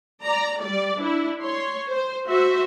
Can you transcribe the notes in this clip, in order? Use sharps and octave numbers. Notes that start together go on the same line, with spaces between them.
D5 A#5
G3 D5
D4 E4
C#5 C6
C5
F#4 C5 E5